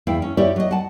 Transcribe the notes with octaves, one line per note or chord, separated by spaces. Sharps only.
E2 E4 F5 G5
C#4
E4 G4 C#5 D5 E5
F#3 D#5
F#5 A5